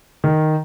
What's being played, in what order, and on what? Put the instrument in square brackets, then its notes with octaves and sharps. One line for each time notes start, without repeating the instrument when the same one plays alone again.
[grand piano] D#3